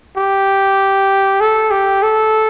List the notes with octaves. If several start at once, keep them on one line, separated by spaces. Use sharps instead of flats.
G4
A4
G4
A4